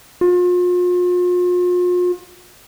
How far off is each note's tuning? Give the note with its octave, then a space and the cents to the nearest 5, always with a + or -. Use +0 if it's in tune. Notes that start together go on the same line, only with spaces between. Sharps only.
F4 +40